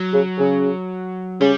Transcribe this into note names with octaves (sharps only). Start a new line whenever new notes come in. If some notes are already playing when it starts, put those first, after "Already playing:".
Already playing: F#3
C#3
C#3
C#3 G3